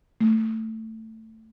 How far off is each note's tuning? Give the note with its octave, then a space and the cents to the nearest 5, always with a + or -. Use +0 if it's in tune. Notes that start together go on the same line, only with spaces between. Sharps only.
A3 +15